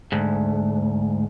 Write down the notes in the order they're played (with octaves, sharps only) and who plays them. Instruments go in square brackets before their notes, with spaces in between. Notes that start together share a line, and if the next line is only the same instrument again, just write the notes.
[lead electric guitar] D2 G#2